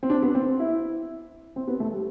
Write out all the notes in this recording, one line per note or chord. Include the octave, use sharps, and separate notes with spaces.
C4
D4
B3
C4
E4
C4
B3
A3
G3